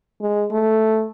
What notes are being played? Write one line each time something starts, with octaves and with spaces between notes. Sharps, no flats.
G#3
A3